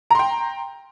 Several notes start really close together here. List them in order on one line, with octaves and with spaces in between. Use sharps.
A#5 C6 G5